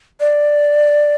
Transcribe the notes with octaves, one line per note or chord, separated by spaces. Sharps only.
D5